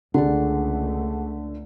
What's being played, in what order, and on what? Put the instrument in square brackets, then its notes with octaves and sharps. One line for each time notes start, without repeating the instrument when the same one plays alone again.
[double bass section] C#2 A3 [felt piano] D3 [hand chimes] G#4 F#5